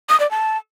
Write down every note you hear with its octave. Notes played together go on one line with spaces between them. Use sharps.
D#6
D5
A5